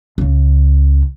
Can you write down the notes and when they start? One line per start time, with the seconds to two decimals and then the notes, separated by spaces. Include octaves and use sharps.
0.18 C#2 C#3